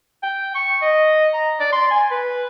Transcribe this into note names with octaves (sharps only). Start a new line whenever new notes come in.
G5
C#6
D#5
A#5
D5
C6
G#5
B4